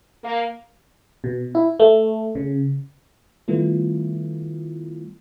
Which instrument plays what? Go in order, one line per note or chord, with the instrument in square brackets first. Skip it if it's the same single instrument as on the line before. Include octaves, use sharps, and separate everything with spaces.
[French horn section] A#3
[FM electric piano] B2
E4
A3
C#3
D#3 G3 A3 B3 E4 F4